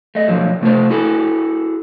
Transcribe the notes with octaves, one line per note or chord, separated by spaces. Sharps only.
A3 D#5
B2 D3 F3 F#3
C3 A3 F4 C5
E4 F#4 G#4 A4